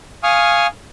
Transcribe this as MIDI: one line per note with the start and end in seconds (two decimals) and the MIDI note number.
0.23 0.67 77
0.23 0.67 80
0.23 0.67 85
0.23 0.67 87
0.23 0.67 89